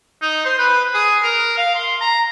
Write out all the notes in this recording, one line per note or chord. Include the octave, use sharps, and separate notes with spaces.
D#4
C5
B4
G#4
A#4
F5
C6
A#5